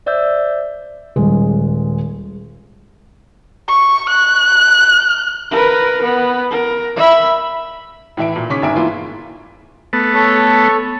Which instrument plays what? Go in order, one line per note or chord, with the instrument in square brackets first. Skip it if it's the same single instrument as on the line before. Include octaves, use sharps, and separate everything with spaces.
[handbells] C5 D5 E5 E6 G6
[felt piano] D#1 G#3
[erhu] C#6
F#6
[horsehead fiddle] A#4 B4
B3
A#4
E5 B5
[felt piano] A2 E3 E5 D7
A#2
G#2 C#3 C#4 C#6 D6 B6
G1 G#2 E5 G#5 D7
E3 A#3 E4 F4
[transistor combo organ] A3 B3
[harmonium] A4 C#5